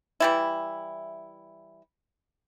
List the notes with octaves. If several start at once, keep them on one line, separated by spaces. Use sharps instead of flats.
E3 G3 E4